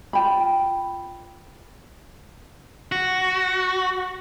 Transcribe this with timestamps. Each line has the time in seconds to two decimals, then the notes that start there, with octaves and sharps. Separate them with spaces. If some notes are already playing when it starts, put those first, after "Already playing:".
0.13 F4 G5 B5
2.92 F#4